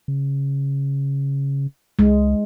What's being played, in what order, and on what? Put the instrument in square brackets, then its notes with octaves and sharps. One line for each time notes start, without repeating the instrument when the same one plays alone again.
[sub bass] C#3
[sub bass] C#2 [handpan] G#3